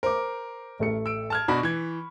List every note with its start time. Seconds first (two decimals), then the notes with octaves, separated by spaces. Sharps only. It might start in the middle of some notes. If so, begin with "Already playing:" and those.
0.03 A#4 C5 D6
0.80 A1 A3 C#7
1.06 E6 D7
1.30 A5 F6 G#6
1.48 B2 D4 F#4 B5 C#6
1.63 E3 G#6